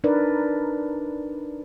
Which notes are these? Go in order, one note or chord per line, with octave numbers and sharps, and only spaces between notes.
D4 D#4 A#4 B4 D5